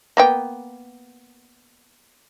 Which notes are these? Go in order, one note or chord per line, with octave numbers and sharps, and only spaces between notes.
A#3 B3 G5